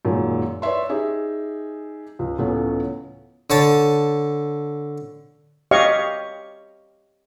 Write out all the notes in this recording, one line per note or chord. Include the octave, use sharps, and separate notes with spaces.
F#2 A#2 D#3 G#3
B4 C#5 D5 E5 C6
D#4 G4 G#4 E5
C#2
C#2 A2 E3 A3 B3 C#4
D3 C#5 A5
G4 C#5 D#5 F5 C#6